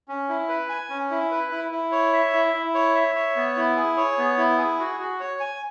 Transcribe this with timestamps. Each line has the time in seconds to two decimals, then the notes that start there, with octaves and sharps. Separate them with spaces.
0.08 C#4
0.29 E4
0.49 B4
0.69 G#5
0.90 C#4
1.11 E4
1.31 B4
1.51 E4
1.72 E4
1.92 C#5
2.13 E5
2.33 E4
2.54 E4
2.75 C#5
2.95 E5
3.15 C#5
3.36 B3
3.57 E4
3.77 G#4
3.97 C#5
4.18 B3
4.38 E4
4.58 G#4
4.80 F#4
5.00 F#4
5.20 C#5
5.40 G#5